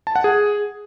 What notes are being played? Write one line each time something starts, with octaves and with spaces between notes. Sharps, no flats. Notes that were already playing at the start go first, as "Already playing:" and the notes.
A5
F#5
G#4